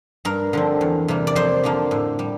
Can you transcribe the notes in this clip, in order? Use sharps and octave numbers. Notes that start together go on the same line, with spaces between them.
G2 A#4
D3 F3 C4
E2
C3 G3 A#3
D5
F2 C5
D3 F3 A#3
A2
G3